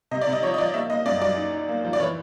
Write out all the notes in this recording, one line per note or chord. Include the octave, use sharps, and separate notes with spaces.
C3 D#5
D5
C3
D#5
F3 C#5
D#5
F3 D5
A#3 E5
A#3 D#5
F#2 D5
F#3 D5
D#4
D#4
A#3
F3
D5
E3 C#5